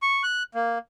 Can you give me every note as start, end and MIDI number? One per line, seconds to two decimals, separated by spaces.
0.02 0.23 85
0.23 0.43 90
0.55 0.78 58